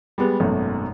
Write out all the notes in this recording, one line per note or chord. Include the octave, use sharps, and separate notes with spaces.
G3 G#3 B3
G#1 F#2 B2 A3